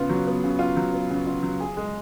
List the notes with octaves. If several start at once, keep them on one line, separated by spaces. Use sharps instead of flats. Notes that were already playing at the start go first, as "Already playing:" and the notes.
Already playing: C#3 B3 F4
F#3
B3
C#3
F4
F#3
B3
C#3
F4
F#3
G#4
G#3